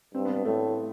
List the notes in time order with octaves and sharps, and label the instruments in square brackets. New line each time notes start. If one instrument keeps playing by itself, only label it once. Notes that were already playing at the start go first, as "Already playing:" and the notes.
[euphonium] G2 [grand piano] C4
[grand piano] B3
B3
[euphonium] A2 [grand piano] A3